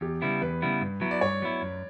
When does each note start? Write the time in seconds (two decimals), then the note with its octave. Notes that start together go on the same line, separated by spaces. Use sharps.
0.01 E2 G4
0.22 C#3 G3 B3 E4
0.41 E2 B4
0.62 C#3 G3 B3 E4
0.81 G2
1.01 F#3 B3 E4
1.11 D5
1.21 G2 C#5
1.42 F#3 B3 E4
1.62 F#2